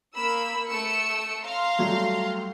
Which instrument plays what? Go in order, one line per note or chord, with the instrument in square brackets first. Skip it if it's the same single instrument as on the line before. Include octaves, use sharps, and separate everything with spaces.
[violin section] A#3 B5 E6
A3 E6 C#7
F5 A#5 C6
[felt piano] F#3 G3 A3